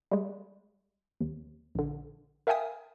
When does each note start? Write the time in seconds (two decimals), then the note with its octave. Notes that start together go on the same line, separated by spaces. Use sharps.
0.11 G3 G#3
1.21 D#2
1.75 A#1 D3
2.47 A#4 E5 F5 G5 G#5 D#6